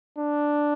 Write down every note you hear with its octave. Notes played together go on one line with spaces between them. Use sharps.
D4